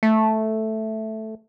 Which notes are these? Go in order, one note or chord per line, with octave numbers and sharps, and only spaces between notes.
A3